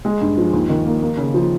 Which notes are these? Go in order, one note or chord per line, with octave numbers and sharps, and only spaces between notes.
G#3
G2
F3
D#2
D#3
A#3
A#3
C#3
F3